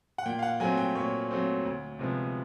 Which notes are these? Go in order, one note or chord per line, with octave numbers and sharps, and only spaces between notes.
F#5
A#2 G5
F5
F#5
F#3 A3 C4 G#5
G5
A#2 C#5
F#3 A3 C4
D2
C3 F3 G#3 B3